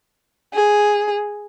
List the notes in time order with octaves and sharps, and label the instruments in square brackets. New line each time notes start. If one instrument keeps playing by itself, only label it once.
[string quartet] G#4